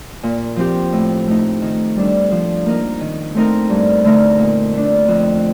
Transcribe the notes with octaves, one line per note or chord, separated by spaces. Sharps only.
A#2
F3 C4 G4
A2
A3 D#4
D#3
G3 D4 A4
F3
A#3 D#4 A#4
D#3
A3 C4 D#4 A#4
G2
D3 A3 D#4 A#4
A#2
A3 D4
F2